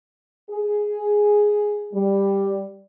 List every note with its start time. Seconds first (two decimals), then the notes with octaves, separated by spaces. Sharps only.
0.50 G#4
1.93 G3